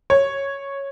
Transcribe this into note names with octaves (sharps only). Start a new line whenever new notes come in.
C#5